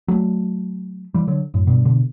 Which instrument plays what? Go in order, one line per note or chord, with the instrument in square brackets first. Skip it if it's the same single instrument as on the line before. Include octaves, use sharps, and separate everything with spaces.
[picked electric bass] F#3 A3
E3 G3
D3 F#3
F#2 A2
G2 B2
B2 D3